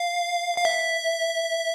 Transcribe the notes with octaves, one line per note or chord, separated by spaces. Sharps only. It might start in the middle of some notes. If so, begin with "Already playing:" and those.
Already playing: F5
F5
E5